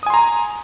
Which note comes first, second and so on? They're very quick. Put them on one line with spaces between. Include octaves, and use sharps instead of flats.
D#6 G#5 C6 A#5